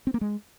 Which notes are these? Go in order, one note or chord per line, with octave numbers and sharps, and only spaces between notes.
C4
A#3
G#3